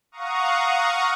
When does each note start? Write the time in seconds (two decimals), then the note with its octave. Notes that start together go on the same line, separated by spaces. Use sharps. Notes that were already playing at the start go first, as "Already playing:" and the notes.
0.12 F5 F#5 A#5 C#6 D#6